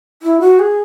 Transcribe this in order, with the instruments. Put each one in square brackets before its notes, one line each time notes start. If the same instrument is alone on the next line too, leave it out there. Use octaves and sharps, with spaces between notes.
[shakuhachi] E4
F#4
G#4